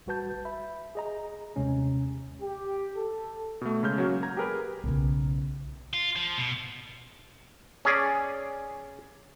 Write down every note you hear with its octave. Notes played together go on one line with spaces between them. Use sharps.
A1 G3 F#4 B4 A5 G6
E5 B5
G#4 D#5 A#5
D#2 C3 G#3 C#4
G4
A4
B2 A3
C#3 G#3 F6 G6
F#3 A#3 C#4 F#4
A#5 G#6
G4 G#4 A#4 B4
B1 C#3
F4
F3
B2
C#4 G#4 D5